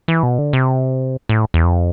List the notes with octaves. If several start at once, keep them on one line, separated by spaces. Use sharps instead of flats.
E3
B2
D3
C3
A2
E2
F2